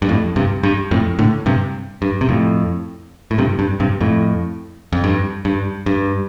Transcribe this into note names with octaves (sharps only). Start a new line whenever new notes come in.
G2
F2 A2
G2 C3
G2
F2 A2
A2 D3
G2 C3
G2
C3
F2 A2
A2
G2 C3
G2
G2 C3
F2 A2
F2
G2
G2
G2